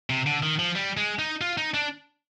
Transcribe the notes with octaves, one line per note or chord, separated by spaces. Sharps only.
C3
D3
D#3
F3
G3
G#3
D#4
F4
D#4
D4